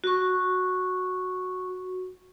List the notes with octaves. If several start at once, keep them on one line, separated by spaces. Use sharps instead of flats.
F#4 C#6